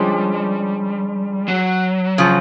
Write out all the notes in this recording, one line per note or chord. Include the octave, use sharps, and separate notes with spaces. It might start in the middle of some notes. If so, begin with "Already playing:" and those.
Already playing: D3 F3 G3 G#3 C#4
F#3
C#3 F3